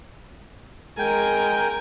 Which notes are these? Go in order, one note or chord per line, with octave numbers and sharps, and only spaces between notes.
G#3 A#4 G5 G#5